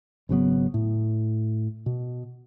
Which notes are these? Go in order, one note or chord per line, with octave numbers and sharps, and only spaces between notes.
G#1 C#3 F#3 B3
A2
B2